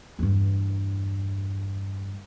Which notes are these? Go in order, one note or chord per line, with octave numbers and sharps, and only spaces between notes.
E2 G2